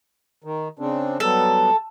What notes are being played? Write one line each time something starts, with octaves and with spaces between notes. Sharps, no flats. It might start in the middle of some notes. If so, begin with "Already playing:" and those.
D#3
C#3 C4 D4
F#3 G3 B3 A4